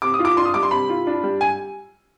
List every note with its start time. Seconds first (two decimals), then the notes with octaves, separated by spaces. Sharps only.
0.02 C3 D6
0.14 D#6
0.19 F4
0.25 D6
0.37 D4 C6
0.45 D#6
0.54 G3 D6
0.63 C6
0.71 C3 B5
0.89 F4
1.07 D4
1.23 G3
1.41 G#5